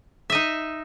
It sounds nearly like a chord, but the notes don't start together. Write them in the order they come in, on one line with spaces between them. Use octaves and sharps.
E5 D#5 D#4